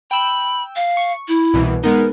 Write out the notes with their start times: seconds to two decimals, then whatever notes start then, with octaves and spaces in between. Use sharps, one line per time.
0.11 G5 B5 E6
0.76 F5
0.97 C#6
1.28 E4
1.53 C2 B2 E3
1.84 G#3 B3 D#4 A#4